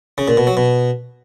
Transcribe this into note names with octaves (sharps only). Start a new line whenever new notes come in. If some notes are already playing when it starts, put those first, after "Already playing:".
C#3
A#2
B2
F#3
B2